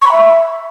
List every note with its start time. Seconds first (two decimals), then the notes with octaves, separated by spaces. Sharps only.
0.01 C#6
0.06 B5
0.11 E5